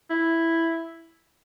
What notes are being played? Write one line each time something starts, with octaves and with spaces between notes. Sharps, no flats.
E4